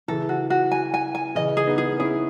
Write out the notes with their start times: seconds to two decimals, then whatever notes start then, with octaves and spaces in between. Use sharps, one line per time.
0.08 C#3 E3 A4
0.29 F#4
0.50 F#4
0.72 G#5
0.94 G#5
1.15 G#5
1.35 C#3 E3 D#5
1.57 G#4
1.67 B3 D#4
1.78 G#4
1.99 C#4 E4 G#4